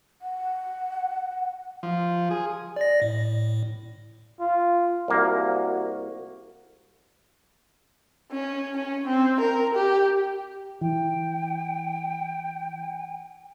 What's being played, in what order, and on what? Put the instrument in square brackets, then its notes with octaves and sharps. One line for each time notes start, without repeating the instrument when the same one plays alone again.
[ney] F#5
[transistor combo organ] F3
G#4
[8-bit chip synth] D5 A#6
A2
[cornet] F4
[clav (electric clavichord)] C2 A#3 [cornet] F#4
[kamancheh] C#4
C#4
C4
A#4
G4
[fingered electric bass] E3 [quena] G5